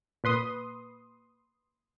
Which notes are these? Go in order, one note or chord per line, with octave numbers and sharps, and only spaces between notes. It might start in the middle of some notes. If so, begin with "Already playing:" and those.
A#2 B4 C6 D#6